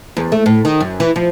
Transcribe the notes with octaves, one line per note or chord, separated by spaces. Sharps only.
E2
A3
A2
D#3
F#2
E3
F3